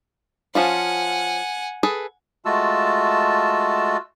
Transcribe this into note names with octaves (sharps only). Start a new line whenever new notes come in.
F3 C#4 F4 F#5 G#5
G#4 A4 B4
G#3 A3 F4 F#4 A5 E6